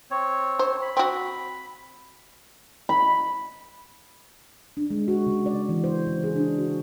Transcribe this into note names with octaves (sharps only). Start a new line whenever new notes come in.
C4 C#5
C5
B5
C4 F#4
B5
D4
G#3
F#4
C#3
D5
E3
C5
C#3
G#4
D4
F#4